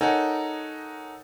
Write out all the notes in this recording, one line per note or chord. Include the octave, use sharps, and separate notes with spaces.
D#4 A4 A#4 C#5 F#5 G#5